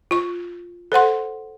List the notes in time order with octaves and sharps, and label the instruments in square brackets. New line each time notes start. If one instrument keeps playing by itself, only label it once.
[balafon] F4 C#6
A4 C5 F#5 C6